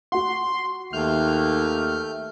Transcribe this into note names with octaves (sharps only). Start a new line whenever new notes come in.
F#4 F#5 C6
D#2 A3 F6 G6